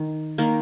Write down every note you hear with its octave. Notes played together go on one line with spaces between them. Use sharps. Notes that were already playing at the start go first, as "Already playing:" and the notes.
Already playing: D#3
D#3 A#3